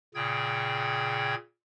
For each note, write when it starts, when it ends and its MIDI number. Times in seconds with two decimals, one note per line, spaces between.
0.15 1.35 46
0.15 1.35 49
0.15 1.35 68
0.15 1.35 79
0.15 1.35 92